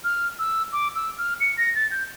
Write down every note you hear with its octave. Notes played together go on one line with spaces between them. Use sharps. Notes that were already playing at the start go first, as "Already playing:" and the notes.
F6
E6
D6
E6
F6
C#7
A#6
A6
G6